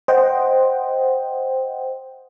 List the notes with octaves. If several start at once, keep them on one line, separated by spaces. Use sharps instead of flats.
C5 D#5 F#5 G5